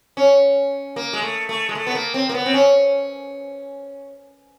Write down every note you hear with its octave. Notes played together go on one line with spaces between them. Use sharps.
C#4
A#3
G#3
A3
A3
G#3
A3
B3
A#3
C4
A#3
B3
C4
C#4